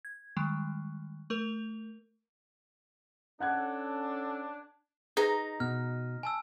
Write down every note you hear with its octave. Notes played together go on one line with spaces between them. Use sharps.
G#6
D#3 G3 G#3
A3 A#4 F7
C#4 D4 A4 F#5 F#6 G#6
D#4 G#4 B4 A#5
B2 F6
G#5 A5 E6